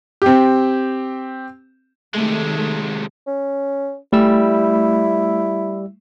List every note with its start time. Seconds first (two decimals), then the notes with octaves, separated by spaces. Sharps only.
0.22 C4 G4
2.14 C3 D#3 G#3 A3
3.27 C#4
4.13 G3 A3 E4 E6